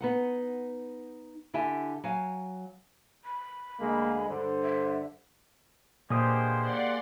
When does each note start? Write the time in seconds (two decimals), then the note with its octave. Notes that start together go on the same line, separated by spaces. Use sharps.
0.01 B3 D#4 F#5
1.54 D3 E4 G4 E5 G#5 A5
2.04 F#3 F5 G#5
3.25 B5
3.80 D2 G#3 A#3
4.30 G2 D3 C5
4.64 E5
6.10 A#2 G#3 A#3 B3 D4 G4 C5 D#6
6.58 D5 F#5 C6